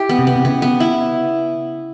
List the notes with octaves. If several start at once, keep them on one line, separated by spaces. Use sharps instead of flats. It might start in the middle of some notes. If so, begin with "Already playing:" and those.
Already playing: E4 G4
B3
C3
B3
C3
C#3 B3
B3
E4